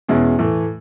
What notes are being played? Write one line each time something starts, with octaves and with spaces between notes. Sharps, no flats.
E2 B2 G#3 C#4 E4
A2 E3 A3